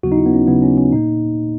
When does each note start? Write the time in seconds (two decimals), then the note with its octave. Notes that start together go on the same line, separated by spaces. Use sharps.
0.03 D#2 C#3 F#3 B3 F#4
0.12 D#4
0.18 E4
0.26 B3
0.34 C#4
0.48 D#2 C#3 F#3 B3
0.62 C#4
0.77 C#4
0.92 A#2 A#3 D#4